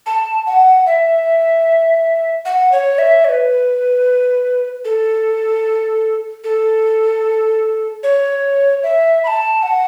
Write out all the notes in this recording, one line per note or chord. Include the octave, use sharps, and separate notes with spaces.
A5
F#5
E5
F#5
C#5
E5
C#5
B4
A4
A4
C#5
E5
B5
A5
F#5